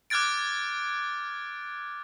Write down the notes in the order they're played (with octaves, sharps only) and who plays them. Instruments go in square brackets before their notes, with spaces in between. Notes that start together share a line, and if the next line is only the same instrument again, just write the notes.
[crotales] D6 F6 F#6 G#6 A6 D7